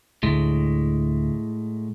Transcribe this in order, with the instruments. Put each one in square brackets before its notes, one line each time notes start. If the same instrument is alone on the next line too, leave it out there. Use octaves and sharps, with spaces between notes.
[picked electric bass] D2 [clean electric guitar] A2 G#3